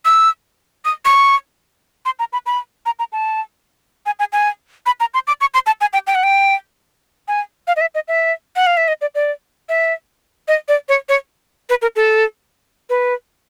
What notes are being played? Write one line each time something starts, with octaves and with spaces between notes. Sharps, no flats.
E6
D#6
C#6
C6
A#5
B5
B5
A#5
A#5
A5
G#5
G#5
G#5
B5
A#5
C6
D6
C#6
C6
A5
G#5
G5
G5
F#5
G5
G#5
F5
D#5
E5
D#5
E5
F#5
F5
E5
D#5
D5
D5
E5
D#5
D5
C#5
C#5
B4
A#4
A4
B4